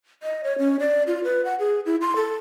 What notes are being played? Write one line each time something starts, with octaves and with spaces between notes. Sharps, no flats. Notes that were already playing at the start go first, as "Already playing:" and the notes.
D#5
C#5
C#4
D5
F4
B4
F#5
G#4
E4
C6
A4